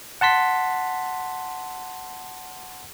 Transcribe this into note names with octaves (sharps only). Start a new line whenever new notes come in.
F#5 A5 C6 B6